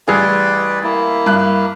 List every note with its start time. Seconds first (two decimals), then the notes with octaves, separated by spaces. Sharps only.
0.08 A1 G3 G#4 B4 D5
0.84 A#3 E4
1.26 G2 F#6